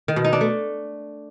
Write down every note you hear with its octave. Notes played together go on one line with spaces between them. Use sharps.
D#3
B2
D#4
D4
A3